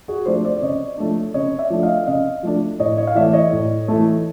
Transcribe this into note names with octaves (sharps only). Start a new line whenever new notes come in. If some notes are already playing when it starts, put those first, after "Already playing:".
F#4 G#4
F3 A3 D4 C5 D5
C5 D5
D5
C#3 C#5 D#5
F3 A3 D4
C#3 C#5 D#5
D5 E5
F3 A3 D4
D#5 F5
C#3 D#5 F5
F3 A3 D4
A2 C#5 D#5
C#5 D#5
F5
E3 A3 D5 E5
C#5 D#5
A2
E3 A3